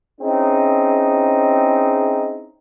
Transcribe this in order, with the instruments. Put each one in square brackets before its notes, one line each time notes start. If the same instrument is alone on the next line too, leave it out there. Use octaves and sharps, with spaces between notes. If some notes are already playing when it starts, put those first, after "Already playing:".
[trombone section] C4 C#4 D#4 E4 G#4